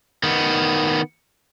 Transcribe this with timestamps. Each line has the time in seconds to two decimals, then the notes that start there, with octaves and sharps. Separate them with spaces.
0.23 D#3 B3